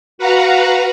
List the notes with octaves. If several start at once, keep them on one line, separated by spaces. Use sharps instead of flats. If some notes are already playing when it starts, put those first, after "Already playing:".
F#4 B4 F5 F#5 A#5